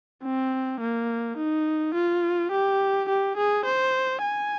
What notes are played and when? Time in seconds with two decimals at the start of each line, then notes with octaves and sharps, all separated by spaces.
0.23 C4
0.80 A#3
1.38 D#4
1.94 F4
2.52 G4
3.09 G4
3.37 G#4
3.66 C5
4.23 G#5